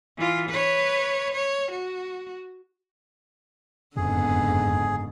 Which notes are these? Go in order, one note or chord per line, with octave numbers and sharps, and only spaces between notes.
E3 F4
B4 C#5
C#5
F#4
F#1 F2 G#2 D3 B3 G#4